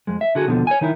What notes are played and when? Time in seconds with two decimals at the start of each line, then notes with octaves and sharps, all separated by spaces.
0.07 F2 G#3
0.21 E5
0.35 D3 F#4 G#4
0.47 D#2 B2 D3 F3
0.67 C#5 G#5
0.81 D#3 D#4 E4